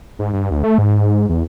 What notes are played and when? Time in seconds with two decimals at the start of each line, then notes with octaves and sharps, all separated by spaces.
0.19 G#2
0.33 G2
0.51 D2
0.64 A3
0.78 G#2
1.29 E2